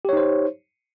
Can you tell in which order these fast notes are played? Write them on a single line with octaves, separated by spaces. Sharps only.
G4 C#5 D#4 C5